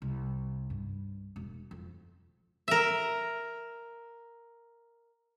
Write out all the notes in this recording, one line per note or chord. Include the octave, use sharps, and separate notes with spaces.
C2
G2
E1
F2
A#4 E5